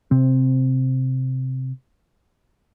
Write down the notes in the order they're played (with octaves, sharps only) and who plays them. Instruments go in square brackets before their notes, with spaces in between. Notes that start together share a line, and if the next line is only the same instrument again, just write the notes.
[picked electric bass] C3 C4